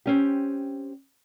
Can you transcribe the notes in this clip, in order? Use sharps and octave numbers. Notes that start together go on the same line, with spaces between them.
C4 C#4 G4